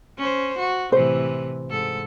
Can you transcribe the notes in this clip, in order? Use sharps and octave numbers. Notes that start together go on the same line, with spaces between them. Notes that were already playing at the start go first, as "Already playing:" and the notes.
C#4 C5
F#4
A2 C3 E3 C5
G#2 A4